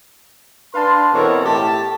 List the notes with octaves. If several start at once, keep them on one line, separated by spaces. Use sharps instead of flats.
D4 B4 F5 A5 C6
B2 E3 C4 A4 A#4 C#5
A2 A3 G4 A5